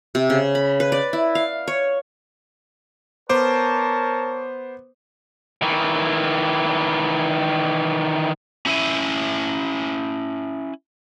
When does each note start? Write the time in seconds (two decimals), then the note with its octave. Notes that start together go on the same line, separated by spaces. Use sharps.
0.15 C3
0.30 C#3
0.55 B5
0.80 B4
0.92 D5
1.13 E4
1.35 F5
1.68 C#5
3.29 B3 A#4 C5 C#5 A5 D6
5.62 D#3 E3
8.66 C#4 E4 E5 F#5 G#5